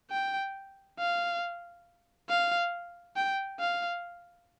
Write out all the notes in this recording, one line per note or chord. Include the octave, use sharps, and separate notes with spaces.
G5
F5
F5
G5
F5